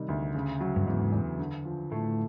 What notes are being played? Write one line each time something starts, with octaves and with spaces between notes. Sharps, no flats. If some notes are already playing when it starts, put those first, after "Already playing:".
Already playing: C3 D#3 G3
D2
C#3
F#3
G2
E2 G#2
E2
D3
F3
A2 A3